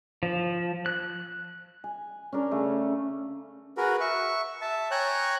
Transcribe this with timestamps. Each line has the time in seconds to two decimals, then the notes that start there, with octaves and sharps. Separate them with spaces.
0.23 F3
0.86 F#6
1.84 G#5
2.32 C#4 D4 A#4
2.51 C#3 A3
3.77 F#4 G#4 A#4 B4
4.00 E5 C#6
4.61 E5 A5
4.91 C#5 G5 G#5 A#5 F#6